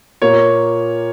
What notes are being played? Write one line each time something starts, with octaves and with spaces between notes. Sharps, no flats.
A#2 A#3 C#5